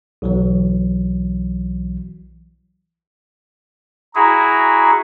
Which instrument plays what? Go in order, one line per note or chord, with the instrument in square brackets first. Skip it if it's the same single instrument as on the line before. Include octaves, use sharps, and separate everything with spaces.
[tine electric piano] B1 E3 F#3
[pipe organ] E4 F#4 G#4 [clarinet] A#5